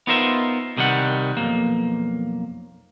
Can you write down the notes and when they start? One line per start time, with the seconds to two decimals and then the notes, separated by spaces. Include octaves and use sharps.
0.07 B3 D#4 F4 A#4 C5 E5
0.77 C2 C3 D#3 G3 F#5
1.37 B1 F2 A#3